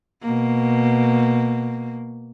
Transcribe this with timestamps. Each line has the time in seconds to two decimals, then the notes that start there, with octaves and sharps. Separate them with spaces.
0.22 B2 A#3